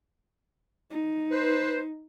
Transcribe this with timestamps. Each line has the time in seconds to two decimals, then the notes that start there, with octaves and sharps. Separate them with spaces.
0.91 D#4
1.31 B4 C5